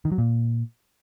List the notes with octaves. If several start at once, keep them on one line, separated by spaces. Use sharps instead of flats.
D#3
F#3
A#2